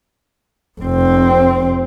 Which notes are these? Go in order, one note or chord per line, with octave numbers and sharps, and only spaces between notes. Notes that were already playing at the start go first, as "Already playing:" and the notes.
F1 C4